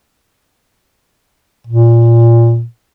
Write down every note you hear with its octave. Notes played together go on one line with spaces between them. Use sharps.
A#2